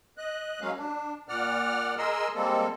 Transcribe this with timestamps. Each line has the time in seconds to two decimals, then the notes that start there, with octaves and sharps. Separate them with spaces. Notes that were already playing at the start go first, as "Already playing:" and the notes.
0.17 D#5 F#6
0.61 F#3 G#3 A#3 C#4 F5
0.77 D4
1.29 A#2 D5 F#5 F6
1.98 G#4 A#4 D#5 C6 E6
2.35 G3 G#3 A#3 C4 A4